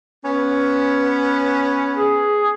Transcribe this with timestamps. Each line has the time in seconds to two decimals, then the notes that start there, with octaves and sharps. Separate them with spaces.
0.25 B3 C#4
1.97 G#4